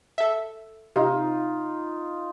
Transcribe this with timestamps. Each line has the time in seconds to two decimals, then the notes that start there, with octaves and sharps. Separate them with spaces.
0.18 A4 E5
0.96 C3 D#4 F4